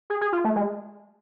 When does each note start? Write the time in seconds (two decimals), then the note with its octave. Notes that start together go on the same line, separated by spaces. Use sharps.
0.10 G#4
0.21 G#4
0.33 F4
0.44 A3
0.56 G#3